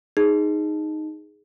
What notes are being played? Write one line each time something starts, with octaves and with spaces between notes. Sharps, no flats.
D#4 G#4